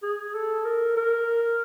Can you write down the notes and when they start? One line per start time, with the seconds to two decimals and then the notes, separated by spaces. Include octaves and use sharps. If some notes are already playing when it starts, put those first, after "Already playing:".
0.03 G#4
0.34 A4
0.65 A#4
0.97 A#4